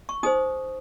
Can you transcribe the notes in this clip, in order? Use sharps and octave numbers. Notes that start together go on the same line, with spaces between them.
C#6
D#4 G#4 C5 D#6